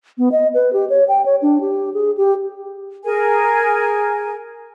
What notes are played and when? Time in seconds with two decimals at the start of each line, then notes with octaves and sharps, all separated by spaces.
0.18 B3
0.32 D#5
0.54 B4
0.73 G4
0.90 C#5
1.08 G5
1.26 C#5
1.42 D4
1.61 G4
1.94 G#4
2.18 G4
3.04 G#4 A#4 G#5